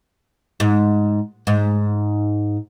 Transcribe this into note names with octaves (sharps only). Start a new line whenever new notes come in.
G#2
G#2